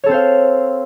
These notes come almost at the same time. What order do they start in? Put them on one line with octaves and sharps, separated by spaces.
C#5 A4 C4 C5 F5